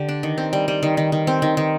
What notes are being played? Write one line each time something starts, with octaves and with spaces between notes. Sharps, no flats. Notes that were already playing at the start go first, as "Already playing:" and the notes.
Already playing: D3 G4
D4
D#3
C4
G3
G3
D#3
D#3
D#3
C4
D#3
D#3